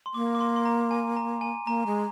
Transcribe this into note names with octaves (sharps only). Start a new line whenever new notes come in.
C6
A#3 D6
D6
C6
C6
A#5
G#5
A#5
G#5
A#3 A#5
G#3